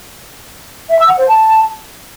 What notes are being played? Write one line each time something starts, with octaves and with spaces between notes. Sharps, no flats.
E5
E6
F#5
C5
A5